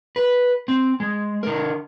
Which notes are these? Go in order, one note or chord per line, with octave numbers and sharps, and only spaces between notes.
B4
C4
G#3
D3 A#4